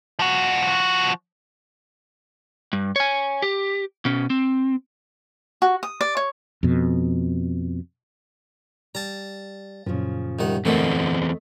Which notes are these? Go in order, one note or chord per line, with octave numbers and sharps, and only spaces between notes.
F3 F#4
G2
C#5 G#5
G4
B2 C#4
C4
F#4
D#6
D5
C#5
F2 B2
G3 A5 A#5
F#2 A#2 C#3 F3
C2 D#3 F#5
E2 D3 A3 C4 A4 A#4 D#5